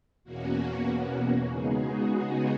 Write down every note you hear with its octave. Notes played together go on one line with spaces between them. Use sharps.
E2 B2 A#3 C#4 F#4
C#3 G#3 B3 D#4 G#4
F#4
F#4